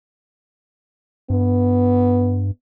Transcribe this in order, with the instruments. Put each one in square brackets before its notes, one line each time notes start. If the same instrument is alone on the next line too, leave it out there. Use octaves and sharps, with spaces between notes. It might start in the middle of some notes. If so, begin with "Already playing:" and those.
[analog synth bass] G2 [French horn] B3